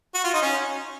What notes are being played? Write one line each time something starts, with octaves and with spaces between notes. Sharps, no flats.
F#4
F4
D#4
C#4